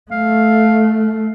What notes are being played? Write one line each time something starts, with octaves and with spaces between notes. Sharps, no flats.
A3 F5